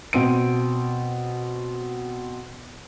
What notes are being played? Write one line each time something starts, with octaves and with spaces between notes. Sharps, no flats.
B2 C4 D7